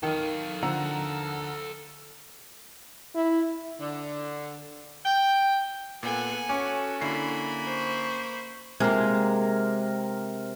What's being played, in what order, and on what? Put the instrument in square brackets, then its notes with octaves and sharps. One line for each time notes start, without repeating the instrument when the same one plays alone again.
[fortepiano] D#3 [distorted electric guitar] A4 F5
[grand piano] D3 F3 [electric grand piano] F#5 A#5 E6
[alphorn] E4
[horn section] D3
G5
[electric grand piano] A#2 [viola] B3 A4 [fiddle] F#5 G#5
[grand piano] C#4 [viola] F#4 A4 [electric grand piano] D6 C#7
[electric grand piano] D3 E4 C7 [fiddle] A#3 B5
[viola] C5 C#6
[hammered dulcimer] C3 A#4 [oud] G#3 A#3